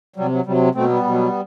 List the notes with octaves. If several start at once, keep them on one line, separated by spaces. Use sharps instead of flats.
C3 F#3 G3
F#3
C3 F#3 G3
B2 F#3 A3 C4
G3 B3
B2 F#3